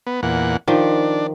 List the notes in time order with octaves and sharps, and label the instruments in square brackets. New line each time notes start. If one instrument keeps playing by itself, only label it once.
[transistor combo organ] B3
E2 A#2 F#5
[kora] D#3 F3 [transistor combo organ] D4